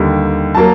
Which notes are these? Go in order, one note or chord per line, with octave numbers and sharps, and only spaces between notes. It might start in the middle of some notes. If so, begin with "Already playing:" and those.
Already playing: D#2 D3 G3
F#3 A#3 A5